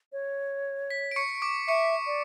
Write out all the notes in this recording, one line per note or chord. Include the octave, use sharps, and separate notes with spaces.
C#5
B6
D7
C#6 C#7
D6 D7
E5 C#6 C#7
D5